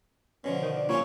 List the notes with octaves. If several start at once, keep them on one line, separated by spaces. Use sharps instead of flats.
B2 D3 F3 C#4
D#3
D4
A#2 G3 C#4 F4 C#5